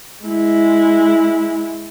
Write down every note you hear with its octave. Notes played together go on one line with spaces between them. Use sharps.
G#3 E4